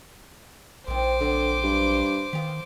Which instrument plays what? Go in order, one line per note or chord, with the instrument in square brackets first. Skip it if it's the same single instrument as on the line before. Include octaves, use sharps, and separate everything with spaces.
[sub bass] A#1 [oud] D#3 C4 [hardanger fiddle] C5 D6
[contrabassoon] D3 [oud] F3 F#3 C4
[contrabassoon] G2
[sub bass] D#3 [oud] B3 G4 F5